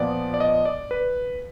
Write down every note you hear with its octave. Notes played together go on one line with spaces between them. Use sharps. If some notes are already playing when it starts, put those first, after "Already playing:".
Already playing: A#2 F3 B3 D5
D5
D#5
D5
B4